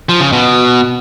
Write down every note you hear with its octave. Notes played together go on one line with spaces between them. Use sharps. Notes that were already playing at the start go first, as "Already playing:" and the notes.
F3
C#3
B2